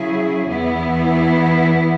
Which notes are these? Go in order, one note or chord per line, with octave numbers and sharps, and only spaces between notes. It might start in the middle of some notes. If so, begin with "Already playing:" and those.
Already playing: C#3 F#3 E4 G#4
E2 E3 B3 E4